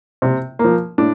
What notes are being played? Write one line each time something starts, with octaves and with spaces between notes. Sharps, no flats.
C3
F3 A#3
A2 D4